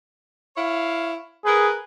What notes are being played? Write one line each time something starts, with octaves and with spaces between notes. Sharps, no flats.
E4 C#5 F5
G#4 A#4 B4